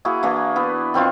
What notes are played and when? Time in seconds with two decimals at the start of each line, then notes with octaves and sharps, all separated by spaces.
0.05 A#3 E4 F#4 G#4
0.23 E3 A#3 D4
0.56 B3 E4
0.94 D#3 C4 D#4 F4